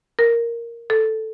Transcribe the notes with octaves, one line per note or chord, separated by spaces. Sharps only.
A#4
A4